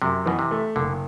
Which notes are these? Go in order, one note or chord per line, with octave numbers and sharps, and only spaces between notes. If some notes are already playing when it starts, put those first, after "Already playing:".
F#2 C3
B2 E3
C3
A3
F#1 D3